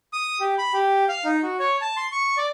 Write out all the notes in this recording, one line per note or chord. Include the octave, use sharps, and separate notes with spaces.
D#6
G4
B5
G4
F5
D#4
F#4
C#5
A5
C6
C#6
D5